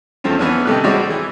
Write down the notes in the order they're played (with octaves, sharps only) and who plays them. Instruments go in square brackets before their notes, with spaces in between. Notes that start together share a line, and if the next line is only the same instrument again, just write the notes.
[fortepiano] E2 F3 A3 C4 C#4
E3 B3 C#4 D4
C3 D#3 A3 G4 E6 F#6
G3 G#3 C4 F#4 C#5 D5
D6
E3